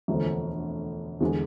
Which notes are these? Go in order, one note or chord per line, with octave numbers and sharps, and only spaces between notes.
E1 D2 D3 F3 A3
E2 D3 G#3